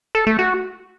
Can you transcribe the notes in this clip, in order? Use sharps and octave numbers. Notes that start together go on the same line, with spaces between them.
A4
A3
F#4